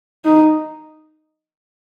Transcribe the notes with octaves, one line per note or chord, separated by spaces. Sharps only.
D#4